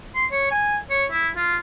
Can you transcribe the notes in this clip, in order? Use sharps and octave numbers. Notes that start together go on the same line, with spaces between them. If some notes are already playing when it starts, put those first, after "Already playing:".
C6
C#5
G#5
C#5
E4
F4